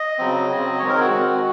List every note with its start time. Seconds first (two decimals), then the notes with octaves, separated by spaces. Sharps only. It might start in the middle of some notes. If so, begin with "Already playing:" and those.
Already playing: D#5
0.19 C#3 F#3 C4
0.49 C#3 F#3 C4
0.79 D#3 G#3 C4 C#5
0.89 A#4
1.00 F#4
1.10 D#3 G#3 C4